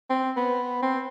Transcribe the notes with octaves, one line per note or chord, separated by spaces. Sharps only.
C4
B3
C4